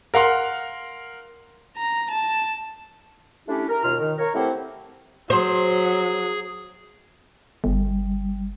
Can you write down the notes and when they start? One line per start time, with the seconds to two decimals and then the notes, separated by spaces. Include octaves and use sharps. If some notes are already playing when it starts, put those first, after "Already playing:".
0.14 A#4 F5 F#5 C6
1.77 A#5
2.11 A5
3.48 A3 C#4 D4 E4 G4
3.68 A#4
3.83 D#2 B2 F4 F6
4.00 D#3
4.18 A#4 C#5
4.35 A3 C4 E4 G4 C5 F#5
5.30 F#3 G#4 C5
7.64 G1 G3